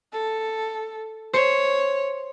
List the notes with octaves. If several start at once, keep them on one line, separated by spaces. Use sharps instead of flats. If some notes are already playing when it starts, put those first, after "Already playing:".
A4
C5 C#5 C#7